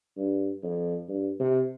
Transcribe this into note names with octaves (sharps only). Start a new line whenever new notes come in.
G2
F2
G2
C3